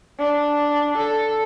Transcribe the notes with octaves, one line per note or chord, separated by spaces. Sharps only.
D4
A4